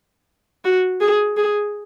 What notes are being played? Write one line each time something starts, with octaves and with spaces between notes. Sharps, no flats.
F#4
G#4
G#4